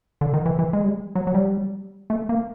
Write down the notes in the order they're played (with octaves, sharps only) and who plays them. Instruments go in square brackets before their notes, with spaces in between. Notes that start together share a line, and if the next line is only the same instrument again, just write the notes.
[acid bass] D3
D#3
E3
E3
G#3
G3
F#3
F#3
G3
A3
A#3